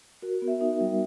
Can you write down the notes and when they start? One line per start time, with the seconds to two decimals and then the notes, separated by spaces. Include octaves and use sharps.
0.22 F#4 A#4
0.42 B3
0.48 E5
0.61 D#4 E5
0.80 G3